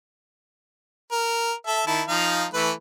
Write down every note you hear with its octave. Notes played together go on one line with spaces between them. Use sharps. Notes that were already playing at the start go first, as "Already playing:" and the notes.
A#4
A4 E5
D#3 E4 A5
F3 D#4 F5
E3 A3 B4